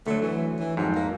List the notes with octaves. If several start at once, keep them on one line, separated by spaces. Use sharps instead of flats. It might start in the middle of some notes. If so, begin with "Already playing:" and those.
D2 F#3 A3
E3
E3
F2 G#2 F#3
A#3